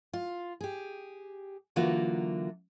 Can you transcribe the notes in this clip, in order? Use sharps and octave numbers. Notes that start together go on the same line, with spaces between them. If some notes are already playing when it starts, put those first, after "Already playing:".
F4
G4 G#4
D3 E3 F#3 A#3 F4 F#4